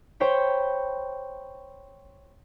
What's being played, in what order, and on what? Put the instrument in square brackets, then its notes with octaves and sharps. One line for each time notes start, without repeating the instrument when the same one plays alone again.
[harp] C5 C#5 G5 B5